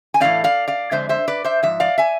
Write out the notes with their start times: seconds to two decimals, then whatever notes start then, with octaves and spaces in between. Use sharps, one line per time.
0.14 G#5
0.20 A2 E3 A3 C4 D5 F5
0.44 D5 F5
0.68 D5 F5
0.91 F2 D3 G#3 C5 E5
1.09 C5 E5
1.28 B4 D5
1.44 C5 E5
1.63 G#2 F3 E5
1.80 D5 F5
1.98 E5 G#5